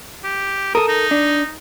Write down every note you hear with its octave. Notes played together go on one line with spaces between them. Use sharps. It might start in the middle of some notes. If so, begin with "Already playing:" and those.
G4
A4 A#4 D#6
D#4
D4